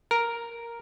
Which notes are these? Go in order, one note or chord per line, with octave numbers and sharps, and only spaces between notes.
A#4